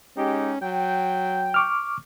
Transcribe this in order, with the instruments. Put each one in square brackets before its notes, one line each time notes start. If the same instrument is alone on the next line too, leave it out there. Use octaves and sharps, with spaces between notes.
[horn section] G#3 D#4 G4 [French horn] C#4
[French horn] F#3 [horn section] G5
[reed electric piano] C#6 D6 F6